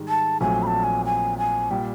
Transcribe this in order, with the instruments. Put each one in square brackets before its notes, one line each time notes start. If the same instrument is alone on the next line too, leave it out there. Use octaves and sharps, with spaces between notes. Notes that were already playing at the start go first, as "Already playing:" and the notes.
Already playing: [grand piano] G#2 D#3 G3
[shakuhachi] A5
[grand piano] A#1 A#2 F#3 A3 C4 [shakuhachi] G#5
[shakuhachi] B5
A5
G#5
G#5
G#5
[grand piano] A#2 G3 [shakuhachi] G5